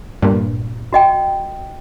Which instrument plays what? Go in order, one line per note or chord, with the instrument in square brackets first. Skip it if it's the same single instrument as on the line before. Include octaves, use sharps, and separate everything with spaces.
[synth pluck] G2 A#2
[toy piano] F#4 D#5 G5